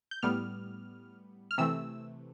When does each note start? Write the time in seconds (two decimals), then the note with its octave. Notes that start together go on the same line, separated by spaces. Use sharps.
0.11 G6
0.22 A2 G3 B3 F6
1.51 F6
1.58 C3 E3 A3 E6